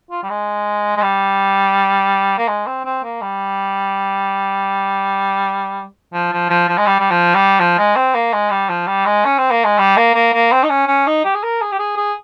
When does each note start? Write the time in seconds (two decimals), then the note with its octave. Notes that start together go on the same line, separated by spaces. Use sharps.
0.11 F4
0.23 G3
0.30 G#3
0.97 G#3
1.02 G3
2.38 A#3
2.48 G#3
2.67 C4
2.85 C4
3.04 A#3
3.22 G3
6.14 F3
6.33 F3
6.50 F3
6.69 F3
6.78 G#3
6.87 G3
7.00 G3
7.11 F3
7.35 G3
7.60 F3
7.78 G#3
7.96 C4
8.15 A#3
8.33 G#3
8.51 G3
8.69 F3
8.87 G3
9.06 G#3
9.25 C#4
9.38 C4
9.51 A#3
9.65 G#3
9.79 G3
9.97 A#3
10.15 A#3
10.34 A#3
10.52 C4
10.64 D#4
10.70 C#4
10.88 C#4
11.07 D#4
11.25 G4
11.35 G#4
11.44 A#4
11.62 G#4
11.72 G4
11.79 G#4
11.97 G#4